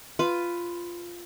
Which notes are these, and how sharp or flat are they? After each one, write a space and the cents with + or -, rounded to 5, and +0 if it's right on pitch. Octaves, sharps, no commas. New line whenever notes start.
F4 -5 B4 +10